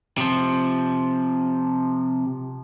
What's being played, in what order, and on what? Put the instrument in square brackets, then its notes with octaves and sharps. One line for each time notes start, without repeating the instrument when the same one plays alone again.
[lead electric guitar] C3 F3